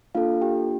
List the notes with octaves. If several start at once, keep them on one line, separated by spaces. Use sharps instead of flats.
A#3 D4 F4 A4 F5
G4 G5